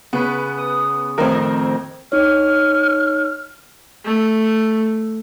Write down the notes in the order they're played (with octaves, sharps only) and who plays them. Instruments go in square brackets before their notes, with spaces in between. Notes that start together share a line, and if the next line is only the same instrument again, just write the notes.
[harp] C#3 B4 [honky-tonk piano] B3
[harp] D#6
[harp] F2 A2 D#3 [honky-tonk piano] C4 A#4
[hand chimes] D#4 C#5 [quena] F6
[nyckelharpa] A3